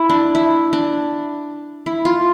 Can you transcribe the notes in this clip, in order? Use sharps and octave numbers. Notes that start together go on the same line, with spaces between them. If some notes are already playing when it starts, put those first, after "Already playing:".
Already playing: E4
D4
E4
D4
E4
F4